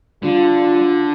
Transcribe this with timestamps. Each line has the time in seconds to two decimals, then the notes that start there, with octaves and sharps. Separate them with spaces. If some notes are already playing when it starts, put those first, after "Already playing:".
0.23 D3 G3 F4